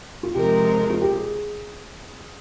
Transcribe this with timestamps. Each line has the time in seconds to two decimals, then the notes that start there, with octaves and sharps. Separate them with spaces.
0.23 F4
0.34 C3 F3 G#3 D#4 G4 A#4
0.74 G#4
0.90 F4
1.01 G4
1.12 G#4